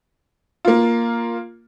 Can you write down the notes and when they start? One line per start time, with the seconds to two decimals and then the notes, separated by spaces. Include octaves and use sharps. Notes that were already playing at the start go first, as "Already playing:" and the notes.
0.65 A#3 F4